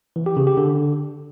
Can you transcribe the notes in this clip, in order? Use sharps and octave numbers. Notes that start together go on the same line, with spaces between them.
E3
G4
C#3
G4
D3